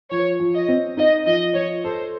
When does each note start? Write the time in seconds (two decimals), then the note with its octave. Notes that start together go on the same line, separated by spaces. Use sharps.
0.11 F3 C#5
0.40 F3
0.54 D#5
0.68 C4
0.97 D#4 D#5
1.26 F3 D#5
1.54 F3 C#5
1.84 A4 C5